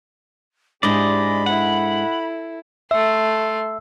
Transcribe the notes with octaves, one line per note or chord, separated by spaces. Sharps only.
G#2 G#3 D4 E4 G4 D5 D#5 B5
E4 A4 F#5
A3 E5 C6 E6